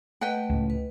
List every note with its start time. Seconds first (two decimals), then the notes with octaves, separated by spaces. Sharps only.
0.21 A3 B4 D#5 F#5 G5
0.49 C#2 A2
0.70 B4